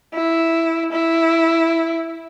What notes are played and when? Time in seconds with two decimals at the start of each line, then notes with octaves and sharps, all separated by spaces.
0.14 E4
0.92 E4